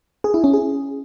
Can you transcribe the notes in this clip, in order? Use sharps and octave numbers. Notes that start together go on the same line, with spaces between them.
G#4
E4
C#4
G#4